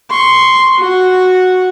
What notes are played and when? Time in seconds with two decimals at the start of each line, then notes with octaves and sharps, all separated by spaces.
0.10 C6 C#6
0.79 F#4